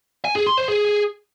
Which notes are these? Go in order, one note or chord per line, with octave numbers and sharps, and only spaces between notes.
G#5
G#4
C6
C5
G#4